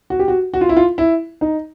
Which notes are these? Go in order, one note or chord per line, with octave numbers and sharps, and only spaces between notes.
F#4
G4
F#4
F#4
F4
E4
F4
E4
D#4